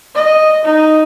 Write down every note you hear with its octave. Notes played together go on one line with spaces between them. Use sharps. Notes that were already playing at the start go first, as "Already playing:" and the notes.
D#5
D#4